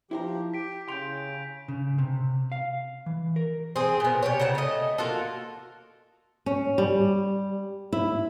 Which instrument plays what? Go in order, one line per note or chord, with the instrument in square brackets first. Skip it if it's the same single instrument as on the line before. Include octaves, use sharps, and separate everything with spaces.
[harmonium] F3 G4 [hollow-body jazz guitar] E4 C5 A#5
[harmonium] G4 [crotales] B6 D7
[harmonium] C#3 [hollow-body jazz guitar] C6 [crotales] G6 D7 F7
[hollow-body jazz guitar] C#3
C3
F5
E3
A#4
[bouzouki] C4 G#4
A#2 B3
C3 G4 C#5
C#3 C5 F#5 A5
A3 D#5
A#3 F4 F#4 A4
[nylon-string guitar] C#4
G3
E4